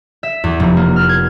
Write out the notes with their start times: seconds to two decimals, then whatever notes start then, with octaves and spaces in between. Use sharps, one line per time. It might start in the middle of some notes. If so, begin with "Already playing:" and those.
0.23 E5
0.44 E2
0.60 F1
0.77 A#3
0.96 F6
1.09 G#6